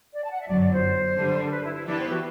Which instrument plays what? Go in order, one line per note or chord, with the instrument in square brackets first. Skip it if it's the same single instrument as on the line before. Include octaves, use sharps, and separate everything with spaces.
[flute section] D5
A5
F#5
E5
[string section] G1 F#2 F#3 [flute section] D5
[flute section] D5
C5
[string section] D3 G3 D4
[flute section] A4
B4
E4
E4
[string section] E3 B3 E4 G4 B4 [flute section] D4
[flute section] C5
F#4